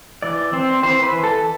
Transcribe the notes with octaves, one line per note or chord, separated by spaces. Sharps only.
E3 D5
C4 C5
E3 C5
B4
E3
A4